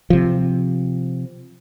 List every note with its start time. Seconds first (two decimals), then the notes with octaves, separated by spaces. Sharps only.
0.10 C3 F3